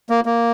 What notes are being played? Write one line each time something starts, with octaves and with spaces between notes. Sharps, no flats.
A#3
A#3